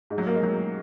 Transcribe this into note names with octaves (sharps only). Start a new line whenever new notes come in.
G#2
F#3
A#3
G#3
F#3